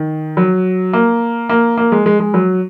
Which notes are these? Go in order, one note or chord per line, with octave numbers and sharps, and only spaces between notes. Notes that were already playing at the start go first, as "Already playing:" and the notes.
Already playing: D#3
F#3
A#3
A#3
A#3
G#3
G#3
G#3
F#3